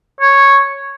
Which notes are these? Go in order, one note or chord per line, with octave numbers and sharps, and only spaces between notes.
C#5